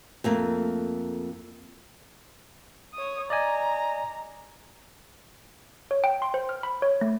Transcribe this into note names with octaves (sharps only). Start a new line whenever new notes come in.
F2 A3 A#3
C#5 D#6
D5 D#5 G#5 A#5
C#5
G5
C6
C5
F6
B5
C#5
A3